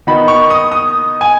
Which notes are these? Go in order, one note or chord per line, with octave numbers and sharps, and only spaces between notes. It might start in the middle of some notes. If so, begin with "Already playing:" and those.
D#3 B3 D#4 B5
C#6
D#6
D#6
G#5